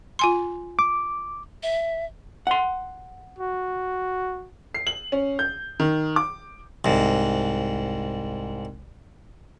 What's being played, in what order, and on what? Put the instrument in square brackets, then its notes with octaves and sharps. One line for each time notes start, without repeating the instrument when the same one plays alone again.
[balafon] F4 G#5 C6
[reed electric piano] D6
[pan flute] E5
[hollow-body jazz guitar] F#5 C6
[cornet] F#4
[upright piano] C7
F#7
C#4
G6
D#3
D6
[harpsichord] C2 G#2